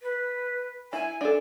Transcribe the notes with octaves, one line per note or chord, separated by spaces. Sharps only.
B4
E4 G#5
D4 A4